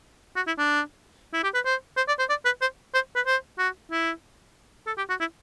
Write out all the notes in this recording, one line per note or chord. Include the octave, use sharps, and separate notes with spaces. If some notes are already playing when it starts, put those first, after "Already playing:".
F#4
E4
D4
E4
G4
B4
C5
C5
D5
C5
D5
B4
C5
C5
B4
C5
F#4
E4
A4
G4
F#4
E4